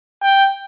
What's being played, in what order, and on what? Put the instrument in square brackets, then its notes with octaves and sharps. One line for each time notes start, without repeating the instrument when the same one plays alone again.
[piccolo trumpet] G5